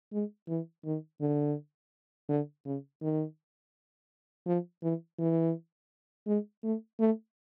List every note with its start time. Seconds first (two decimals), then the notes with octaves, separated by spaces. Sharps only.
0.12 G#3
0.48 E3
0.85 D#3
1.21 D3
2.29 D3
2.65 C#3
3.02 D#3
4.46 F3
4.82 E3
5.19 E3
6.27 G#3
6.63 A3
6.99 A3